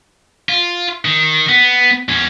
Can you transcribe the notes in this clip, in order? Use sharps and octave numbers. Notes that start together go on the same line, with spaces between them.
F4
D#3
B3
E2 C#4